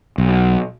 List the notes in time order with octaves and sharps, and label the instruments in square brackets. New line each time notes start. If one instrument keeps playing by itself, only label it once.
[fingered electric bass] B1